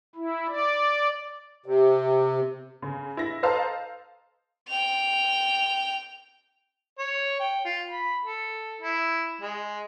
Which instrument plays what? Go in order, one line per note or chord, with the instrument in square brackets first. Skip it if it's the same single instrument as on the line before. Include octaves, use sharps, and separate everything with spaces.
[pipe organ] E4
D5
[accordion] C3
[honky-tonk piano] C#3
E4 A#6
A4 C5 D#5 F5 A5 A#5
[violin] G5 F7
[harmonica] C#5
G5
F4
B5
A4
E4
G#3